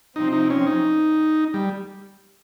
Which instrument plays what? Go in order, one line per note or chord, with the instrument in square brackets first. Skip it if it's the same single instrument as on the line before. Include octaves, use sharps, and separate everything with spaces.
[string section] C3 F3 C4 [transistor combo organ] D#4
[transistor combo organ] D#4
C#4
D#4
G3